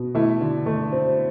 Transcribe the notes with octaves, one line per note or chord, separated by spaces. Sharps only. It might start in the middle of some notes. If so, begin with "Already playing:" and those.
Already playing: B2
A3 E4
D3
A3
C4